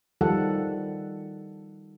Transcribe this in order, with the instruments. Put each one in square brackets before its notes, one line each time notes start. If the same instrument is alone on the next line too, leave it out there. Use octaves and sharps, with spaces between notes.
[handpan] D#3 F3 G3 A4 F#5